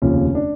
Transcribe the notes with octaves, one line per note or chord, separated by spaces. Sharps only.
F1 D#2 C#3 F3 C#4
D4